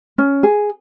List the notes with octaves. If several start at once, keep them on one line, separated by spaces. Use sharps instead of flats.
C#4
G#4